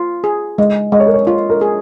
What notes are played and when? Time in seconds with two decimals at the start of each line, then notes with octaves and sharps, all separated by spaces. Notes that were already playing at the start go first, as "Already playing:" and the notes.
Already playing: F4
0.24 G#4
0.58 G#3 D#5
0.92 G#3 D#5
1.00 C#5
1.07 A#4
1.14 C#5
1.27 F4 C#5
1.50 A#4
1.61 G#4